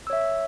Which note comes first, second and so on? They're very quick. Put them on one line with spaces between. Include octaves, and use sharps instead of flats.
E6 C#5 E5